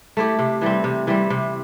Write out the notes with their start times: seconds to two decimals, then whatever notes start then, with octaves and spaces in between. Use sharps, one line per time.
0.17 A3 E4 G4
0.39 C3
0.61 E3 G3 C4
0.84 C3
1.07 E3 G3 C4
1.30 C3